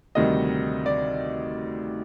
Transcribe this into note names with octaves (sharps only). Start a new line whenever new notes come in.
D2 C3 D#3 G3 D#5
D5